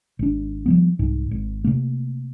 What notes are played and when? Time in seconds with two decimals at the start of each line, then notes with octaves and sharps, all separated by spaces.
0.19 G#1 D4
0.66 F3 G3 B3
0.99 C2 G#2
1.31 G#1
1.64 C3 A3 A#3